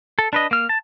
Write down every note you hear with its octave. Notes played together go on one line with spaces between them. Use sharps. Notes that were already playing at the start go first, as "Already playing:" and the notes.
A4
D4 B4 D#5
A#3 F6
A5